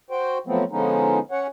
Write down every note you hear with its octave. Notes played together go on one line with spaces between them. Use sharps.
F#4 C5 G5
F3 F#3 A3 B3 C4
D3 F3 G#3 B3 C#4 D#4
C#4 C#5 F#5